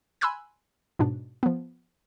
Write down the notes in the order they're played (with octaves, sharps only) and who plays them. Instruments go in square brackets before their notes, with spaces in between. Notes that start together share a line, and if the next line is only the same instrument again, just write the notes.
[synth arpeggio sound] G#5 B5 C6 E6 F#6 G#6
G#2 B2 D4
F3 B3